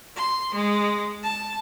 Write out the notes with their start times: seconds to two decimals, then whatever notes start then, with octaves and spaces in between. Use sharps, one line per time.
0.16 C6
0.54 G#3
1.23 A5